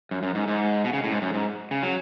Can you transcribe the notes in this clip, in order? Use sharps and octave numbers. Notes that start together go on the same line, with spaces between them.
F#2
F#2
G#2
G#2
B2
C#3
A2
G#2
F#2
G#2
C#3
F#3